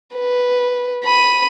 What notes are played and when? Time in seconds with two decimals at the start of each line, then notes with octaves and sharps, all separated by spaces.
0.16 B4
1.05 B5 D#7